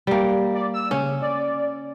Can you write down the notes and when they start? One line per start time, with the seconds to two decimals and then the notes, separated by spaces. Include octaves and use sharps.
0.07 G3 A#3
0.54 D5
0.74 E6
0.91 C#3 C#4
1.22 D5